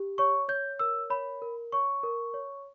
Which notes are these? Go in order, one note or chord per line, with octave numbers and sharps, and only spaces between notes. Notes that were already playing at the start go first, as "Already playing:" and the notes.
Already playing: G4
C#5 C#6
C#5 G6
A#4 E6
C#5 B5
A#4
C#5 C#6
A#4
C#5